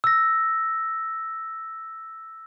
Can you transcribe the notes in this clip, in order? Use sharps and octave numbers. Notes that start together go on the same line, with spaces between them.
E6 A#6